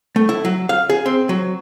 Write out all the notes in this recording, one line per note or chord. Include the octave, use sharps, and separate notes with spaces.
A3
E4
F#3
F5
G#4
C4
F#3